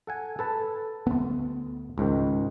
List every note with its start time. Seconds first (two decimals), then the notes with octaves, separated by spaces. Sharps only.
0.07 A4 F#5 G#5
0.39 A4 B4 A5
1.07 D2 B3
1.98 C#2 G#2 D#3